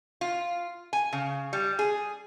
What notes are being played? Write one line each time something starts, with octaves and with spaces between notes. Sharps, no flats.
F4
G#5
C#3
G3
G#4